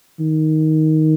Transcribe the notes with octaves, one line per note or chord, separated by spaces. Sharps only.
D#3